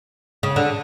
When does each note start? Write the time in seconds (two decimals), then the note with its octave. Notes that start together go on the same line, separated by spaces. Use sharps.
0.43 C#3
0.56 D3